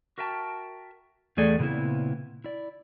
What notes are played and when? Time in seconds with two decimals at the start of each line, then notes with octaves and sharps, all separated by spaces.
0.18 F#4 A#4 E5 G5 A5
1.37 E2 A3 G#4 A4 D5
1.59 A#2 C#3 B3 C4 E4
2.44 E4 D5